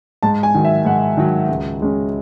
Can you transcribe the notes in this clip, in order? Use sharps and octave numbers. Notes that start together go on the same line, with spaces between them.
G#2 A5
G#5
D#3 F#3
E5
G#2 F#5
D#3 F#3
C#2
C#3 G#3 C#4